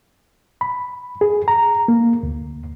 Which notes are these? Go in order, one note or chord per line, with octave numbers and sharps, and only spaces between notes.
B5
G#4
A#5
A#3
D2